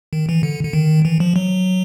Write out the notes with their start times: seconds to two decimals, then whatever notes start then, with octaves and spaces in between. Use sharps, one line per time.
0.13 D#3
0.29 E3
0.43 D3
0.64 D3
0.73 D#3
1.05 E3
1.20 F3
1.36 F#3